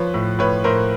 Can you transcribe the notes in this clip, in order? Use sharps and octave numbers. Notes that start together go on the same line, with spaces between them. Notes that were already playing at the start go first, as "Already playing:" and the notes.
Already playing: F3 B4 C#5
A2
A2 B4 C#5
A2 A#4 C5